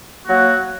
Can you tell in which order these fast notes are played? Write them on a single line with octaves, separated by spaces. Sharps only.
A#3 F#4 F#3